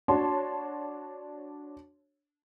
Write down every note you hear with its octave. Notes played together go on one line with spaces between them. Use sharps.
D4 F#4 C#5 A5 C6